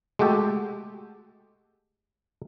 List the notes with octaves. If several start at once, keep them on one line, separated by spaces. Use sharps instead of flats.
G#3 A3 F#4 G4 A4